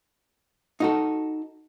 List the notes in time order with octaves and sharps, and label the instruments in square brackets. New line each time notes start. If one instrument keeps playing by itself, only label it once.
[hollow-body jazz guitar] D#4 F#4 A4